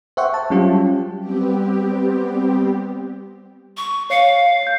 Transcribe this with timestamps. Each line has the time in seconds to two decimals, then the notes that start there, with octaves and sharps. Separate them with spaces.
0.17 C5 E5 F#5 G5 C#6
0.34 A5
0.50 F#3 G3 C#4 F4 G4
1.19 G3 B3 C4 G4
3.77 C#6
4.10 C#5 F5 C7 C#7
4.63 G6 C7